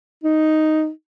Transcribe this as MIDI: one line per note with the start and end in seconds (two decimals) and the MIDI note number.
0.23 0.90 63